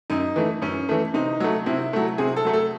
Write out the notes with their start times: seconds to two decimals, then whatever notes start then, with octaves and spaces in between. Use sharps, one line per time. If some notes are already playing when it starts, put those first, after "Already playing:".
0.10 F#2 D#4
0.36 E3 A3
0.62 F#2 C#4
0.89 E3 A3
1.14 C3 D#4
1.40 F#3 A3
1.66 C3 E4
1.93 F#3 A3
2.18 C3 G#4
2.36 A4
2.45 F#3 A3
2.53 A4